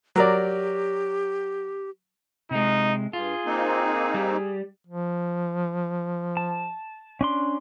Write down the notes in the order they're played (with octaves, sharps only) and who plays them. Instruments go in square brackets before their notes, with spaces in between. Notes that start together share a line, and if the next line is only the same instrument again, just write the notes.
[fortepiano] F#3 A#4 D5 [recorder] G4
[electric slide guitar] C3 G#3 [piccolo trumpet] D#4
[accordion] G2 [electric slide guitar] F4 [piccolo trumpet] G#4
[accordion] A#3 C4 D#4
[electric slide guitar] G3
[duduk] F3
[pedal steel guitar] A5
C#4 D4 C6